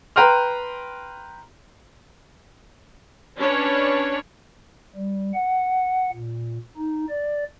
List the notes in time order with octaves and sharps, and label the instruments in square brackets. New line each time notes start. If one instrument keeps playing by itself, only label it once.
[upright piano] B4 G5 A#5 C6 F6
[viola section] C#4 D4 B4 C#5
[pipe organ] G3
F#5
A#2
D#4
D5